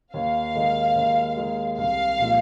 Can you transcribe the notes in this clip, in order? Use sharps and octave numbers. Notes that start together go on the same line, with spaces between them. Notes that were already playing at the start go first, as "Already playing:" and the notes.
D#2 F5
D#3 G#3
D#2
D#3 G#3
C2 F5
A#2 F3 G#3